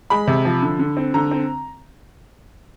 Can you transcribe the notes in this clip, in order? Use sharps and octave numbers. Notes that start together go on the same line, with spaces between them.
G#3 B5
C3
F3
D3
D3
C4
D3 A#5
C4